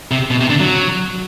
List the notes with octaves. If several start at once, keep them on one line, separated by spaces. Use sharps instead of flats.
C3
B2
C3
D3
F#3